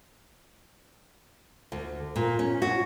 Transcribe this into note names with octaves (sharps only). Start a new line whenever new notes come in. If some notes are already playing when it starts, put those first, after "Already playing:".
D2
A#2
C#4
F#4